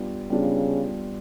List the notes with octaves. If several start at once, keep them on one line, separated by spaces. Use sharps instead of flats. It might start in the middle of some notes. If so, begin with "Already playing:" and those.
Already playing: G3 B3 D4 F4
C#3 G3 B3 D4 F4